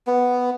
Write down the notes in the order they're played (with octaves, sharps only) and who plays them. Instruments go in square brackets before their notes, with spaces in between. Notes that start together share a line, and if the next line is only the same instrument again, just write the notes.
[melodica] B3